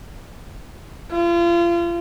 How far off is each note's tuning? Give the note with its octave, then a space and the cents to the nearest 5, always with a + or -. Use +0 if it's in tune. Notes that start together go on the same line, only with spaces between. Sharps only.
F4 -35